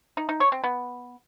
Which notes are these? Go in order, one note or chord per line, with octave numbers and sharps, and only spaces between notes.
D#4
D#4
C#5
C4
B3